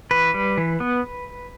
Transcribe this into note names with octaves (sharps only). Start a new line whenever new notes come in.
E3 B4
G3
E3
B3